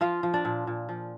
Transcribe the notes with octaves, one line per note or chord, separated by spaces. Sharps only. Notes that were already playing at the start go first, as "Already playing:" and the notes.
F3 F4 F5
F3
D4 D5
A#2
A#2
F3